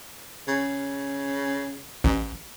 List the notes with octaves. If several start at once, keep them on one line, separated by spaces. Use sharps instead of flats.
C#3
A1